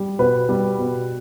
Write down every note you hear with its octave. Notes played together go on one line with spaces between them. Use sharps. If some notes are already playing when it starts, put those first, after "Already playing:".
Already playing: G3
B2 B4
G3
B2